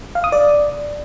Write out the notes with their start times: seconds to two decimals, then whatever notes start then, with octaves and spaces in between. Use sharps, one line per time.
0.15 F5
0.24 D#6
0.32 D5